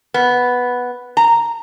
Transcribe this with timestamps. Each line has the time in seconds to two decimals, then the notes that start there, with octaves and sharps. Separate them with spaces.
0.14 B3
1.17 A#5